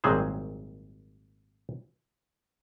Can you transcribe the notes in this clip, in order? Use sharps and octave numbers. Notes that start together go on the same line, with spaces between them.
G#1 A#2 F#3 G3 G#4 C5